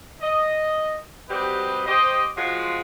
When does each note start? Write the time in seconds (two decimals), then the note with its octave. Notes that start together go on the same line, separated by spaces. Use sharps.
0.21 D#5
1.29 G3 C4 F#4 G4 B4 D#5
1.87 G4 C5 D#5
2.37 F3 G#3 F4 F#4